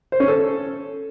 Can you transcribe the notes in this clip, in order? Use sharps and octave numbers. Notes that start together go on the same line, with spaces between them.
C5
C#4
A4